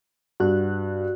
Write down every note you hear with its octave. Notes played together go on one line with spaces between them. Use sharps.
G2 F#4 F#6